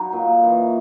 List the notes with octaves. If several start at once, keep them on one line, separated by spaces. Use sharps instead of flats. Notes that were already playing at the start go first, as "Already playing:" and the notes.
Already playing: F#3 D#4 F#4
A#2
E3